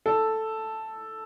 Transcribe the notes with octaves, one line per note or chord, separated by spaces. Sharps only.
A4